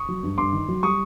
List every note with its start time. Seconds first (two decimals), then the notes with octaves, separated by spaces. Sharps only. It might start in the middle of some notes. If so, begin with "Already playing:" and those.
Already playing: C#6 D#6
0.09 F#3
0.23 G2
0.38 G2 C6 D6
0.53 D#3
0.69 F#3
0.83 G3 C#6 D#6